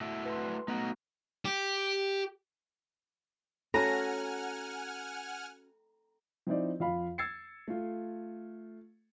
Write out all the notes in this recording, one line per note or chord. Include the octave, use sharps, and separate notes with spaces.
A3 E4 F#4
B4 C6
A3 B3 D#4 F#4
G4
C#4 F#4 A4 F#5 G#5 A#5 F6
F3 C4 D#4 E4 C5 D5
F2 F4 F5 B5
E6 G#6 A6 C7 C#7
A3 F4